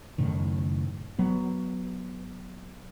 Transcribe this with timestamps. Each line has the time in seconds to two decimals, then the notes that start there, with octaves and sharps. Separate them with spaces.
0.18 F#1 A2 D#3
1.19 F#3 B3